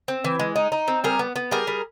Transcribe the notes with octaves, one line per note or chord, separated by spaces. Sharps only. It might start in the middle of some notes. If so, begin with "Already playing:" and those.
C4
E3
G#3
D#4
D#4
C4
G3 G#4 A#4
B3
B3
G3 G#4 A#4
G3